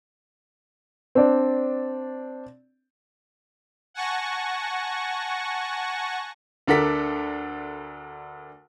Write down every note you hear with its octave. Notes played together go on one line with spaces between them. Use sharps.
C4 D4 D5
F#5 G#5 A5 C#6 A#6
D2 D4 A4 A#4 F#5 B6